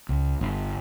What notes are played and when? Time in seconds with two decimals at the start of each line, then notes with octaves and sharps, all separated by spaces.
0.09 C#2
0.41 G1